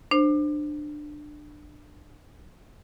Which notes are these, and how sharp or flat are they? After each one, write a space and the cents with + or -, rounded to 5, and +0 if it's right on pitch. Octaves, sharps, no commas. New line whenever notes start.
D4 +20 C5 +0